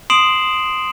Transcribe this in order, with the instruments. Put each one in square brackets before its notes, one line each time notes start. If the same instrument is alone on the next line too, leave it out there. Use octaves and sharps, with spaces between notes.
[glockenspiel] C6 D#6 C7 D7 E7 F#7